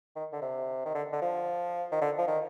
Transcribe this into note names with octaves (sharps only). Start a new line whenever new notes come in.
D#3
D3
C3
D#3
D3
D3
F3
D#3
D3
F3
D#3